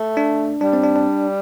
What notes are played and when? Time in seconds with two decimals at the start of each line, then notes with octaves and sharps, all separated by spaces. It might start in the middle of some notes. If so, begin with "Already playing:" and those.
Already playing: A3
0.17 D4
0.61 G3 D4
0.73 C4
0.83 D4
0.96 D4